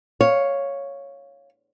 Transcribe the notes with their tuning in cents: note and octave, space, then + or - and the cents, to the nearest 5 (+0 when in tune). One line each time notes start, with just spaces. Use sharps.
C#5 +0 F5 +0